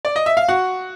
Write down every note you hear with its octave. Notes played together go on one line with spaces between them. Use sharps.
D5
D#5
E5
F5
F#4 F#5